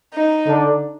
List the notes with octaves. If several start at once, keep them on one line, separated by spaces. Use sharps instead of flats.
D#4
D3 D4